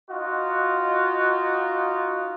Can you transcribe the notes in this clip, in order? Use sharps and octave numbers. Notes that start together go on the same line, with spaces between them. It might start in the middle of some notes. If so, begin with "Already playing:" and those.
D#4 F4 F#4 D#5